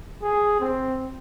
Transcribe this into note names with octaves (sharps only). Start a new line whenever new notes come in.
G#4
C4